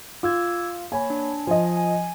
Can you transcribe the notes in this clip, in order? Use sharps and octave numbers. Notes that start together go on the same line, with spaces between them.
F4 D6 E6 G#6
A#3 C#5 G#5 B5
D4
F3 D#5 G#5
G#5